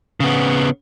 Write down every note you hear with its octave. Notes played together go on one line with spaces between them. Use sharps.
C#3 B3